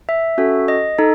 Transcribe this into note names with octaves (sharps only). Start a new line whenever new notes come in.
E5
C#4 F#4 A4
D#5
D#4 A4